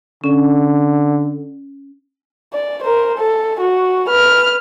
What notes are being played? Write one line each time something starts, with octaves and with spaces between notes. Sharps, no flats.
D3 C#4
D5
A#4 C5
A4
F#4
B4 F6